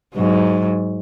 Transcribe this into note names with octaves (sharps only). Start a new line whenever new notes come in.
G#2 F#3